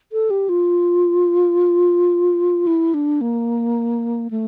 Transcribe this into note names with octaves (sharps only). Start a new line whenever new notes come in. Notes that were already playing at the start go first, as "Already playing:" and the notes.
A4
G4
F4
E4
D4
A#3
A3